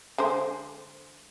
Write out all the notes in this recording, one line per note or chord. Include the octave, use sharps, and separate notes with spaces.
D3 G#3 C5